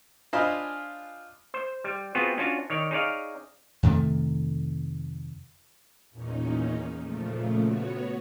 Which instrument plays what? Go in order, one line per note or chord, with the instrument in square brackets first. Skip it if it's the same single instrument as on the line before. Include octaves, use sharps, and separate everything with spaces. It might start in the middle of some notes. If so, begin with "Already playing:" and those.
[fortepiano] D4 F4 C5 D#5 G#5 B5
[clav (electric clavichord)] C5
G3
B3 C4 F4 F#4 G#4
C#4 D4 F4 F#4
D#3 C#5 D5
D#4 G#4 C#5 D5 F5
[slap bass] F2 C3 D#3 A3
[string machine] E2 A#2 C#4 D#4
A#2 C#3 F3 A3
B3 F#4 C#5